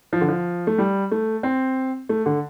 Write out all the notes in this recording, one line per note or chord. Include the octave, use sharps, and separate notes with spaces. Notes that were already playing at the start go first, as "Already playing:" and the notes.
F3
D3
F3
A3
G3
A3
C4
A3
D3